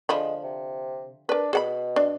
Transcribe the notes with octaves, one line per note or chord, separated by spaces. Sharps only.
D3 F3 G#3 B5
C3
D4 A#4 B4
B2 G#4 F#5 B5
D4